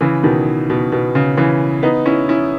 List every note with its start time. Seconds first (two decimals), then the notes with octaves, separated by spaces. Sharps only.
0.01 C#3 E3
0.23 B2 D#3
0.70 B2
0.92 B2
1.15 C#3
1.37 C#3 E3
1.83 B3 D#4
2.06 C#4 E4
2.29 C#4 E4